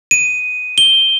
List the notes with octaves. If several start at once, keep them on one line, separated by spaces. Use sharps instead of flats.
D#7
G7